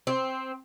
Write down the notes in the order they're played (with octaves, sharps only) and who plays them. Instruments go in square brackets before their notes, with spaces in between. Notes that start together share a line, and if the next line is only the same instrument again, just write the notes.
[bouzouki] C4